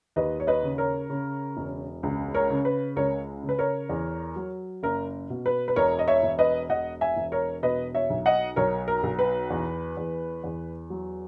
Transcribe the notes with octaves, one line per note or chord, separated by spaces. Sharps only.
D#2 B4 D#5
C#5
B4 D#5
C#3
A#4 C#5
C#3
E1
C#2
A#4 C#5
C#3
B4
C#2 A#4 C#5
C#3
B4
A#4 C#5
E2
F#3
F#1 A#4
B2
B4
B4
E1 A#4 C#5
D#5
C#5 E5
E1
B4 D#5
E1 D#5 F#5
E5 G#5
E1
A#4 C#5
B2 B4 D#5
C#5 E5
B1
D#5 F#5
B1 A#4 C#5
A#4
B1
B4
E2
E2
E2
F#3